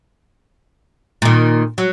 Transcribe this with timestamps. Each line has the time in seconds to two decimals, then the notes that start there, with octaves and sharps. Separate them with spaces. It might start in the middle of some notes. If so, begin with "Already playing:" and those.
1.22 A#2 D#3
1.78 F#3